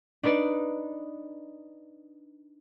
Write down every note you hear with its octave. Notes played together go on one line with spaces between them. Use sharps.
D4 D#4 B4 D5